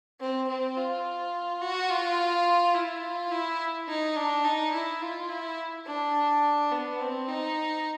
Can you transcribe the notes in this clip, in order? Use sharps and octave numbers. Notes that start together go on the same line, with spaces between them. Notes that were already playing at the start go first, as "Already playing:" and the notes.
C4
C4
F4
F#4
F4
E4
F4
E4
D#4
D4
D#4
E4
F4
E4
D4
B3
C4
D#4